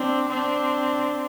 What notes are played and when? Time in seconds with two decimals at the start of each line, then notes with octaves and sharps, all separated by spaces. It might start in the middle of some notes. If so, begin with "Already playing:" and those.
Already playing: C4 D4
0.29 C4 D4